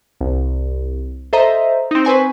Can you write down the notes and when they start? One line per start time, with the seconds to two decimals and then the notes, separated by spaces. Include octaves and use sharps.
0.21 C2
1.33 A4 C5 D#5 E5 A#5
1.91 C4 D#4
2.05 B4 C5 G#5 C#6